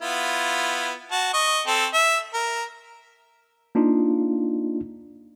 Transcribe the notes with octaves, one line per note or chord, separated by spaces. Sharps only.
B3 E4 F4
F#4 A5
D#5 C#6
C4 A4
E5
A#4
A#3 D4 D#4 F4